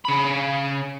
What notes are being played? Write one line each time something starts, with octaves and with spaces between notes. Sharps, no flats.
C#3 B5